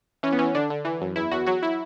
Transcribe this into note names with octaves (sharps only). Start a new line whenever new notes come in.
E3 C#4
B3
E3 C#4
D3 D4
D3
E3
F#2
E2 E4
E2 F#4
F#3 F#4
E4